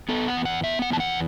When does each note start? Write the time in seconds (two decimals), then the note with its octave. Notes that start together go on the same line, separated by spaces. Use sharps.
0.09 B3 A4
0.28 F#5
0.37 E2
0.45 F#5
0.64 B3 E5
0.82 F#5
0.91 E2 A5
1.00 F#5